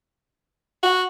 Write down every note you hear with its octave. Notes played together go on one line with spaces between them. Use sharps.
F#4